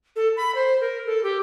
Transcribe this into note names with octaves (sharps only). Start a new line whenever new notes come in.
A4
B5
C5
A#4
A4
G4